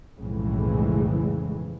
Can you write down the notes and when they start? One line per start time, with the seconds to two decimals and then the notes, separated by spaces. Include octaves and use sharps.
0.18 B1 F2 A2 C#3 E3 G#3